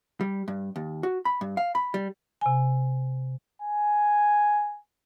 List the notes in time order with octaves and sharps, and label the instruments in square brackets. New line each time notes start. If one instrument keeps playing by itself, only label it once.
[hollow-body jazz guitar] G3
G2
D#2
F#4
B5
G2
F5
B5
G3
[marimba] C3 G#5
[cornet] G#5